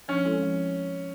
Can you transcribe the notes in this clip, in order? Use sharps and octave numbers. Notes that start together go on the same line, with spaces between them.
F3 C#4
G#3 C4 E4 A4
F3